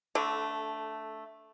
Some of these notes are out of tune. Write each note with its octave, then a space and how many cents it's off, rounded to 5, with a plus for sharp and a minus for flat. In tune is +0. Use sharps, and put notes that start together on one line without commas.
D3 -20 A3 +0